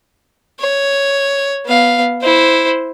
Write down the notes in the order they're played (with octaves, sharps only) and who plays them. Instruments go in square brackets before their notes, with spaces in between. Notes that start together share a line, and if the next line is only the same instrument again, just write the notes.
[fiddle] C#5
B3 F5
E4 C5